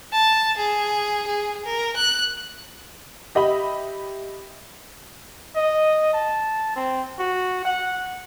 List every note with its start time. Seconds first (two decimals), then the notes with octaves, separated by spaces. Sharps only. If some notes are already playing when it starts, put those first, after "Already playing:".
0.13 A5
0.57 G#4
1.27 G#4
1.65 A#4
1.96 F#6
3.35 G4 D#5 E5 B5
5.56 D#5
6.13 A5
6.76 C4
7.19 F#4
7.65 F#5